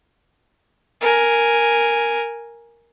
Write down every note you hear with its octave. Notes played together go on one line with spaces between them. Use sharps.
A#4 G#5